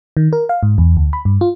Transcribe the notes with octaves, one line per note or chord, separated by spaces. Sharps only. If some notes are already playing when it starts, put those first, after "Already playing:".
D#3
A#4
F5
G#2
E2
D2
B5
G2
F4